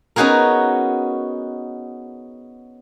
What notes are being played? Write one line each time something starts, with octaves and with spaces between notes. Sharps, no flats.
B3 C#4 D#4 F#4 G#4 A#4